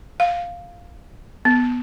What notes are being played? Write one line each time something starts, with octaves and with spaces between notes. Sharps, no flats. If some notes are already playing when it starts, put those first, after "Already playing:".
F5
B3